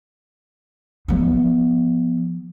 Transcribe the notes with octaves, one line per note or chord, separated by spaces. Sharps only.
F3 B3